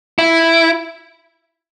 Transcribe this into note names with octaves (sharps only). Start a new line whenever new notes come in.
E4